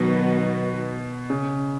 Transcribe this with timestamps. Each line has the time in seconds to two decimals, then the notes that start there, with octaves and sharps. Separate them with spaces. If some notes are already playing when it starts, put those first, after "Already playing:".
Already playing: B2 D#3 F#3 B3 F#4
1.30 C#3